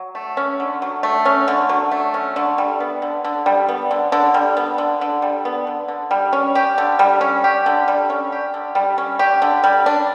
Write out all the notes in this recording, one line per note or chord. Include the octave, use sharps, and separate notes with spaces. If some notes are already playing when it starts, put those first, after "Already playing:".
Already playing: F#3
A3
C#4
D3
F#3
A3
C#4
D3
F#3
A3
C#4
D3
G3
B3
D3
D3
G3
B3
D3
D3
G3
B3
D3
D3
G3
B3
D3
D3
G3
C#4
G4
D3
G3
C#4
G4
D3
G3
C#4
G4
D3
G3
C#4
G4
D3
G3
D4